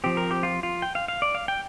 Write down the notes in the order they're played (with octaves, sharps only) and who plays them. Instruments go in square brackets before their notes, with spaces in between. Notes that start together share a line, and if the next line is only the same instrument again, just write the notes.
[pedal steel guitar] F3 C4 G4
A#4
G4
F4
F4
G5
F5
F5
D5
F5
G5